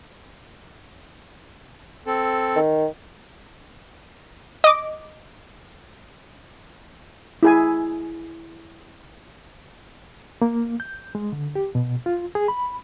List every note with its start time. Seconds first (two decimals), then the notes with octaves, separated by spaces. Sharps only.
2.07 C4 A4
2.56 D#3
4.64 D#5 D6
7.43 E4 G#4 G#5
10.42 A#3
10.80 G6
11.15 G#3
11.32 D3
11.55 G4
11.75 B2
12.06 F4
12.35 G#4
12.48 B5